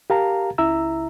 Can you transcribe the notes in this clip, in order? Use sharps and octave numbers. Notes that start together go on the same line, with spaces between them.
G4 A#4 F5 A5 A#5
C#2 C#3 E4 E5 A#5 E6